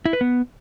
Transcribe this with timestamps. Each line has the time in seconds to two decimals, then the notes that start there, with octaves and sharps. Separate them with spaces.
0.06 E4
0.13 B4
0.21 B3